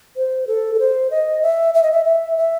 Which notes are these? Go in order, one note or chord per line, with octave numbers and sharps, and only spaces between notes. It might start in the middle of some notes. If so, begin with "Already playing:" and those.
C5
A4
A4
C5
D#5
E5
E5
D#5
E5
E5
E5